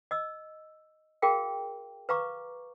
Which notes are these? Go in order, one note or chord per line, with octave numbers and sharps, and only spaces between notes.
D#5 E6
F#4 G#4 A#4 F5 G5
B4 F5 A#5 C#6 D6